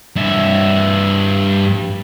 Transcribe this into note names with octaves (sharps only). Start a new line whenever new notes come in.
G2 E5